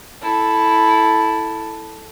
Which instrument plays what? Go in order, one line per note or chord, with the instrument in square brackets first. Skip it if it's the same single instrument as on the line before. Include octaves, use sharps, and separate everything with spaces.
[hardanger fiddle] E4 A4